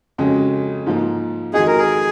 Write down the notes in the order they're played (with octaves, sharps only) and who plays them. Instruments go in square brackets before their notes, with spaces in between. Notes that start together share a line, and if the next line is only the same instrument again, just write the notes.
[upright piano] F2 C#3 G#3 C#4 F#4
G#2 F3 A#3 F4
[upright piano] F2 D#3 G#3 D#4 F#4 [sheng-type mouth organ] G#4
[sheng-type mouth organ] A#4
G#4